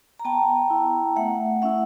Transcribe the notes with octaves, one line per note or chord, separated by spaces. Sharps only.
A#5
B3 G5 A5
E4
A3 E5 F#5
C#4 E4 E5 F#5